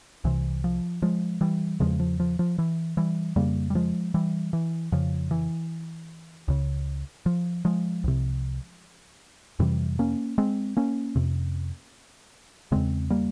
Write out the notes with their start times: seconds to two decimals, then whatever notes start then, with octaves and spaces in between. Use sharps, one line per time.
0.24 C2 C3 E3
0.64 F3
1.02 F3 G#3
1.41 E3 G3
1.80 E2 C#3 F3 G#3
2.00 F3
2.20 F3
2.39 F3
2.58 E3
2.97 E3 G3
3.36 F2 C#3 G3 A#3
3.70 G3
3.75 F3 G#3
4.14 E3 G3
4.53 E3
4.92 F2 C#3 F3
5.31 E3
6.48 C#2 C#3
7.26 F3
7.65 F3 G#3
8.04 C2 C3
9.59 F2 C3 E3 G3
9.99 A#3 C#4
10.38 G#3 C4
10.77 A#3 C#4
11.16 F2 C3
12.72 E2 C#3 G#3 C4
13.10 G3 A#3